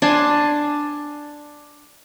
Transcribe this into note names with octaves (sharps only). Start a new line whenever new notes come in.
D4 G#5 A5 C6